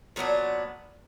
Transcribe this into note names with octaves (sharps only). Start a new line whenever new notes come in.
A#2 F#3 B3 D4